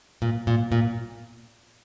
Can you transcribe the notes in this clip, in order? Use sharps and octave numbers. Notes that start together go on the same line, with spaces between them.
A#2
A#2
A#2